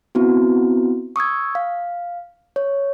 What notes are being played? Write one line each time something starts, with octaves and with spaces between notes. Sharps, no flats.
B3 C4 E4 F#4
C#6 D#6 E6 G#6
F5
C#5